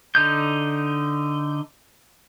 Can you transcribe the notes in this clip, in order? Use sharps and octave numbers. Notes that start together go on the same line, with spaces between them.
D3 D#4 G6